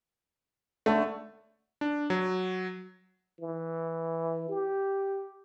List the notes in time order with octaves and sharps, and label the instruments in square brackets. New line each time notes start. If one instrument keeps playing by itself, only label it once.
[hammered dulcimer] D3 A4 C#5 [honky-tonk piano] A3
[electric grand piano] D4
F#3
[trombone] E3
G4